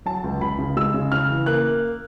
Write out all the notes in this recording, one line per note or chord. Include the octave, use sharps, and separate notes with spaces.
F#3 A5
C#2
C#2 B5
C#3
G#3 E6
C#3
C#3 F6
E3
A#3 F#6